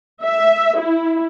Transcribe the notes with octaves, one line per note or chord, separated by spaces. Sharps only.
E5
E4